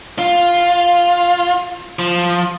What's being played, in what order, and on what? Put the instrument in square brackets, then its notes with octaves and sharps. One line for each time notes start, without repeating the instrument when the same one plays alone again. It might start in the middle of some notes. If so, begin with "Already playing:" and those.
[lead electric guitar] F4
F3